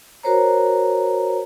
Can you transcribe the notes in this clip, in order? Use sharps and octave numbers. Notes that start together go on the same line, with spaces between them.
F#4 A#4 C5 C#5 A#5